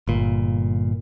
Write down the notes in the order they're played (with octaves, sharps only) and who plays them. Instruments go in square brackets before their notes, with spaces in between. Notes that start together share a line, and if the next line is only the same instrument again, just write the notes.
[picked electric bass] G1 A#2